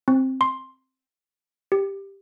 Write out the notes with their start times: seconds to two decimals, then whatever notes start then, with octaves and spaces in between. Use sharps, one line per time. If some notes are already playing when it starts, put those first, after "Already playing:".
0.08 C4
0.41 C6
1.72 G4